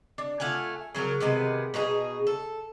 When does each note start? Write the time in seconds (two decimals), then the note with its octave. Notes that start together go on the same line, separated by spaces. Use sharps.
0.18 D4
0.40 A3 F4 F#5 G#5
0.95 C#3 F#3 G#4 A#4
1.20 C3 D#3 G#3 B3
1.74 B2 D#4 F#4 G#4
2.27 A4